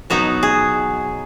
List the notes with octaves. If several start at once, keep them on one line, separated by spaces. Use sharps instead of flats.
B2 F#3 B3 D#4 F#4
G#4